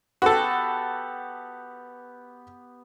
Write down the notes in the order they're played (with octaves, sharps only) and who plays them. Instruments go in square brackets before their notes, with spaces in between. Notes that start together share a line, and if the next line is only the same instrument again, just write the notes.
[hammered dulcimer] B3 G4 [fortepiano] F#4 A4